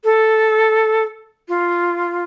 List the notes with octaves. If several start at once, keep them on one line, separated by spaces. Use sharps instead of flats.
A4
F4